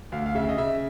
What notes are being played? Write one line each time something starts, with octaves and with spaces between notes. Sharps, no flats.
D2 F5
F5
C#3 E5
D#5
C#3 E5